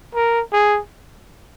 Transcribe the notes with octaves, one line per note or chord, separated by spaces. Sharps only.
A#4
G#4